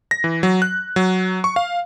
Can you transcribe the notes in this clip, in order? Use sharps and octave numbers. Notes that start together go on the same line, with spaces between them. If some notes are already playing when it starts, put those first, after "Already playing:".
A#6
E3
F#3
F#6
F#3
C#6
F5